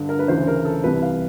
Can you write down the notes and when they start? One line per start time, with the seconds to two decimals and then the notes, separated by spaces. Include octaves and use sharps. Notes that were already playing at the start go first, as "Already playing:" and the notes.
Already playing: G2 D3
0.09 A#4
0.19 B4
0.28 D2 C#3 E3 C5
0.47 A#4
0.65 A4
0.84 C2 C3 E3 B4
1.02 F5